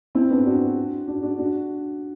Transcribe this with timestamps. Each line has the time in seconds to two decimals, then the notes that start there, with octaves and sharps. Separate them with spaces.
0.15 C4 E4
0.30 B3 D4
0.46 D4 F#4
1.08 D4 F#4
1.23 D4 F#4
1.38 D4 F#4